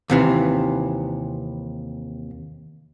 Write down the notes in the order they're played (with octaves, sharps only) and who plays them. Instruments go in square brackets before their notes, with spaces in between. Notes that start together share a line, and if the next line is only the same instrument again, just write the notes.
[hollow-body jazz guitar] D#2 C3 E3